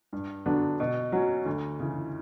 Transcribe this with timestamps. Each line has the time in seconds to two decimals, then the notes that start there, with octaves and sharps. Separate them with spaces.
0.13 G2
0.46 D3 F#3 B3 D4
0.80 B2
1.12 F#3 C#4 F#4
1.46 D2
1.80 C#3 E3